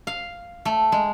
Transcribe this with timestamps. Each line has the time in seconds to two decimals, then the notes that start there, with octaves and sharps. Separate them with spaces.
0.07 F5
0.65 A3
0.92 G#3